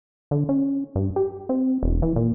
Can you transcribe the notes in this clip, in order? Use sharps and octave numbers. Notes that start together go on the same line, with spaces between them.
D3
C#4
G2
G4
C4
E1
E3
A#2